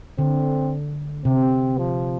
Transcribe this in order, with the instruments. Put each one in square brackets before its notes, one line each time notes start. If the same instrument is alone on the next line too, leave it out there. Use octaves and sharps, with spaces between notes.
[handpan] D3 [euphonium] C4
[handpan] C3 [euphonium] C4
[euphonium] F3